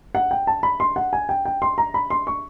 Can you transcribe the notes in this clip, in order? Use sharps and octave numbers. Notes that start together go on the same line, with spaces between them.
F#5
G5
A5
B5
C6
F#5
G#5
G5
G5
C6
A#5
B5
C6
C#6